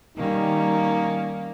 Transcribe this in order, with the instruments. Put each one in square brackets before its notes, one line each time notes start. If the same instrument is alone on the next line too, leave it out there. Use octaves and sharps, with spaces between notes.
[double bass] D#3 G3 [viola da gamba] A#3 C#4 [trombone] D#4